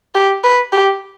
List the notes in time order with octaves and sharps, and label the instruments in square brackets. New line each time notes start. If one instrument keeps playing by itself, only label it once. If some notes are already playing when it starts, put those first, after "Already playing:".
[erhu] G4
B4
G4